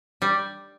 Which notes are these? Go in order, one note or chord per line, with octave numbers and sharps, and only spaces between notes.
G3